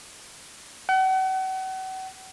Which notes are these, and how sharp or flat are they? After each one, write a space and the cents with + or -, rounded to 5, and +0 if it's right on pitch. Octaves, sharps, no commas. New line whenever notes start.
F#5 +40